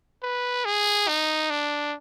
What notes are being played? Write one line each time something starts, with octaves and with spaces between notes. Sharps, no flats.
B4
G#4
D#4
D4